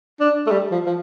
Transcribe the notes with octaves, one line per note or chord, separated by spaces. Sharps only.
D4
A3
G3
F3
F3